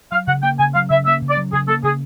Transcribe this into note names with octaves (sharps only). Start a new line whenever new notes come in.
F#3 F5
C#3 F#5
A#3 G5
C#3 G#5
F#3 F5
C#3 E5
A#3 E5
C#3
D5
F#3
C#3 G#4
A#3 A4
C#3 G#4